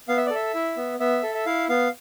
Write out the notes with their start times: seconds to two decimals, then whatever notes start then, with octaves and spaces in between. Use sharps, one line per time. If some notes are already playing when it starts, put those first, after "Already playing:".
0.08 B3 F5
0.17 E5
0.26 D5
0.30 A4 E5
0.54 E4
0.77 B3
1.00 B3 E5
1.23 A4
1.34 E5
1.46 E4 F5
1.69 B3 F5